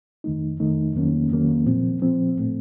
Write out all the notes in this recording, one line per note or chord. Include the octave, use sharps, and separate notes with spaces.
F2 D#3 A3 D#4
F2 D#3 A3 D#4
F2 D#3 F#3 A#3 C#4
F2 D#3 F#3 A#3 C#4
A#2 F3 C4
A#2 F3 C4
A2 A3 C4